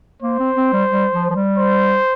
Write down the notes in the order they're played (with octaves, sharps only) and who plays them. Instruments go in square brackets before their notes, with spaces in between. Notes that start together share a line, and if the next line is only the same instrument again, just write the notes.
[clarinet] A#3 [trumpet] C5
[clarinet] C4
C4
G3
G3
F3
F3
G3
[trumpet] C5